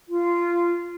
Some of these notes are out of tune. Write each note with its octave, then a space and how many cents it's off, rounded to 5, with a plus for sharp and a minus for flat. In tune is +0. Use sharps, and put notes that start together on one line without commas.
F4 -15